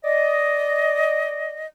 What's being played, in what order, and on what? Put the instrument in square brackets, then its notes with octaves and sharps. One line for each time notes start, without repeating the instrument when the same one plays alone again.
[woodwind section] D5 D#5